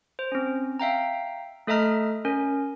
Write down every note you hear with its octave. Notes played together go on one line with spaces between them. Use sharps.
C5
C4 C#4
E5 F5 G5 A#5
A3 A4 D#5 E5 A#5 F6
C#4 A#4